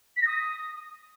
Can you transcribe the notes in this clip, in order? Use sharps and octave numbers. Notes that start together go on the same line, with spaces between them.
B6
A#6
D#6